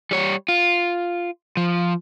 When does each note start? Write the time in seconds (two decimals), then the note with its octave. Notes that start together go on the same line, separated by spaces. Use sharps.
0.11 G3 C#5
0.48 F4
1.57 F3